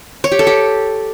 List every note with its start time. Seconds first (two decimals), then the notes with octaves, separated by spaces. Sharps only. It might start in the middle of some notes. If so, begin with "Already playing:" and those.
0.24 C#5
0.32 G4
0.39 A4
0.47 G4